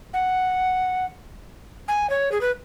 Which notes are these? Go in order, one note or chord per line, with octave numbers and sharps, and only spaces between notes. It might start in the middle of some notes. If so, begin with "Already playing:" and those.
F#5
G#5
C#5
G#4
B4